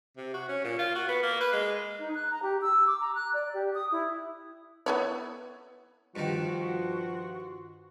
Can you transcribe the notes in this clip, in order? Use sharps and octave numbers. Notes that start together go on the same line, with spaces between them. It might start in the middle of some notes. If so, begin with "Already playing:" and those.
C3
F#4
C#4
A#2
F4
F#4
B3
A#3
B4
G#3
D#4
F#6
A#5
G4
E6
D6
A#5
F#6
D5
G4
D#6
E4
B3 E4 C#5
G2 D#3 F3 F#4 C6